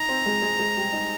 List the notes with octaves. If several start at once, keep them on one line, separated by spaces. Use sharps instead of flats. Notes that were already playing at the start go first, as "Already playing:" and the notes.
Already playing: D#4 D#5 A#5
C4 C5
G#3 G#4
G#3 G#4
G#3 G#4
G3 G4
D#4